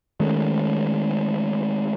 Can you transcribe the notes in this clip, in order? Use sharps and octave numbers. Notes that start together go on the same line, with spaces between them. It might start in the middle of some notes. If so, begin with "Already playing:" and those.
D#3 G#3 A3 C#4